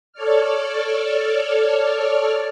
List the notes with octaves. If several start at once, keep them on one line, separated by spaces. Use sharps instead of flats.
A4 C#5 D5 F6